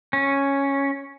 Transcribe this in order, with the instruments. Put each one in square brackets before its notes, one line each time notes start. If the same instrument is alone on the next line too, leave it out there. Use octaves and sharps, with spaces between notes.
[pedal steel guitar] C#4